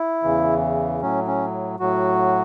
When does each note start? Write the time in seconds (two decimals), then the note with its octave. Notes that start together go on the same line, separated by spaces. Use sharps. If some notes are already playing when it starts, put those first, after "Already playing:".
Already playing: E4
0.23 E2 C#3 E3
1.01 A2 F#3 C#4
1.27 C#4
1.80 A2 F#3 F#4